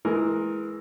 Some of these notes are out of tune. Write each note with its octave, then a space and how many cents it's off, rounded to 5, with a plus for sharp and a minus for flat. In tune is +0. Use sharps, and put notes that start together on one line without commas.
E3 +0 G#3 +25 A#4 +0